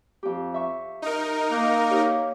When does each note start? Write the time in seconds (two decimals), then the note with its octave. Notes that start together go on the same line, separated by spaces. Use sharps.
0.23 F2 G4
0.54 E5 C#6
1.02 D#4 A#4
1.51 A#3 F#6 G6
1.90 G4 C#5